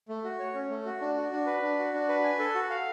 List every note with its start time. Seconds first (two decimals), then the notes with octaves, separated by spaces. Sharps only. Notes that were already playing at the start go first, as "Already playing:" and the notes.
0.09 A3
0.24 F#4
0.39 C#5
0.55 C#4
0.70 A3
0.86 F#4
1.01 D4
1.17 F#4
1.32 D4
1.47 B4
1.62 D4
1.79 F#4
1.93 D4
2.09 B4
2.24 G#5
2.39 A4
2.55 F#4
2.70 F5